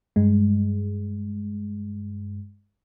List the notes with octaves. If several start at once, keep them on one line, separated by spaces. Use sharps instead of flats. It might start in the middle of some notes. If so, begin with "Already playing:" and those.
G2 G#3